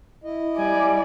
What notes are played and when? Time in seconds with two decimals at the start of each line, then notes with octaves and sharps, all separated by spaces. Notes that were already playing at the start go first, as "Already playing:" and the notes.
0.24 E4 D#5
0.57 G3 D5 G#5